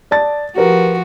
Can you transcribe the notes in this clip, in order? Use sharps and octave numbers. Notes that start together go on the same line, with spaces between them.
D5 A5 A6
F3 F#4 G4 A#4 B4